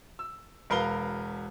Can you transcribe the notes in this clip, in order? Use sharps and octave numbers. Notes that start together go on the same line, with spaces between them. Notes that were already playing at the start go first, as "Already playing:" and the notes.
E6
E1 A#4 B4 F5 G7